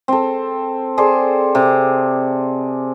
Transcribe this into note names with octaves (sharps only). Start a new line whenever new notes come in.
C4 A4
G#4 A4 C5 D5
C3